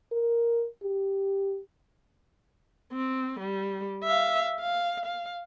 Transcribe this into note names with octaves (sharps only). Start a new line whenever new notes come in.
A#4
G4
C4
G3
E5 F5
F5
F5